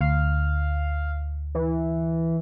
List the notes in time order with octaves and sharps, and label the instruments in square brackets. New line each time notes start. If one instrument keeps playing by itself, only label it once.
[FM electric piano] D2 [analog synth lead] F5
[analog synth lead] E3